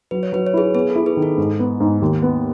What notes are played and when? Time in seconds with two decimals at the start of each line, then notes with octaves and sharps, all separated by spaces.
0.11 F#3 B4
0.23 C#5
0.32 F#3 B4
0.47 C#5
0.54 E4 G#4 B4
0.74 B3 G#4
0.90 A4
0.96 E4
1.06 G#4 B4
1.17 D#3
1.22 A4
1.38 G#2
1.59 B3
1.80 G#2
2.02 D#2
2.22 B3